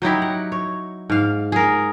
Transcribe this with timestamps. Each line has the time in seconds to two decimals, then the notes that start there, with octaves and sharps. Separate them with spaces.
0.02 F#3 D#4 E4 G4
0.22 F#5
0.52 C#5
1.10 G#2 F5
1.52 G#4 A#4